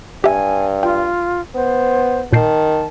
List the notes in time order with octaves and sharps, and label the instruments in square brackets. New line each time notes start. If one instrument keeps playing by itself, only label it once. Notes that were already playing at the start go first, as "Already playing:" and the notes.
[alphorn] G2 [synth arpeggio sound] G4 E5 [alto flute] G#5
[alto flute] F4 [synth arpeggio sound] G5
[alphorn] B3 [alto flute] C5
[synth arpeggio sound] A#2 G6 C7 [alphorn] D#3 [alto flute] A5